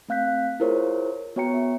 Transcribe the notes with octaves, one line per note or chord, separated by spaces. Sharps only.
A3 C4 F5 F#6 G6 B6
E4 F4 G#4 A#4 C5 C#5
B3 F#4 C#5 G5 A#5 C#7
E5